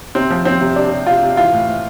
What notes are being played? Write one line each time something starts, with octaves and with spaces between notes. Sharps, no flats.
C3 C4
F3
F3 C4
C3
C3 D4
C3
C3 F4
C3
E3 F4
A2
A2